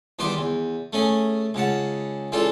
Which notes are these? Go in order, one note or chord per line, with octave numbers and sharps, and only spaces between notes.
E2 D#3 G3 B4 C6 D6
E2
A3 C#4 G#4
C#2 C#3 F#5 A5
C#2 E3 D4 F4 A4